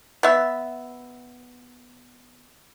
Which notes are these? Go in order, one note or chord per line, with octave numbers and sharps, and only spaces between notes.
B3 E5